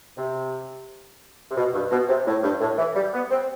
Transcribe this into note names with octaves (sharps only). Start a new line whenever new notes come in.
C3
C3
B2
G2
B2
C3
A2
G2
A2
E3
G3
B3
C4